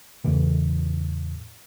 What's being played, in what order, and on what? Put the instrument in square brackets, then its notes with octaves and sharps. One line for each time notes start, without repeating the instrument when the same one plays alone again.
[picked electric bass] E2 A2 C#3 E3